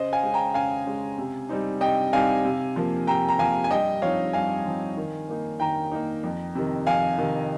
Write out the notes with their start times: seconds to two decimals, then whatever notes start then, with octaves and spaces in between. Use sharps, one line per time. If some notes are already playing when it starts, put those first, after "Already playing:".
Already playing: C#3 C5 D#5
0.13 F5 G#5
0.23 G#3 C#4
0.34 G5 A#5
0.54 C#3 F5 G#5
0.86 G#3 C#4
1.18 C3
1.49 G3 C4 D#4
1.81 C3 D#5 G5
2.13 G3 C4 D#4 F5 G#5
2.45 C3
2.76 F3 A#3
3.07 C3 G5 A#5
3.29 A#5
3.39 F3 A#3 F5 G#5
3.64 G#5
3.70 G2 D#5 G5
4.02 F3 C4 D#4 C#5 F5
4.33 G2 F5 G#5
4.66 F3 C4 D#4
4.97 D#3
5.29 A#3 D#4
5.60 D#3 G5 A#5
5.92 A#3 D#4
6.23 F2
6.55 C3 D#3
6.87 F2 F5 G#5
7.18 C3 D#3